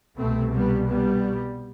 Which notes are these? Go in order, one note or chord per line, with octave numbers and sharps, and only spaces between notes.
C2 B2 A3 C4
G3 B3
G3 B3